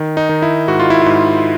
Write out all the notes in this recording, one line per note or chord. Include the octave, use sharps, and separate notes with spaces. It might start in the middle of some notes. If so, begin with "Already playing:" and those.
Already playing: D#3
D#4
D#3
E4
G#2 F#4
F4
E4
G#2 F4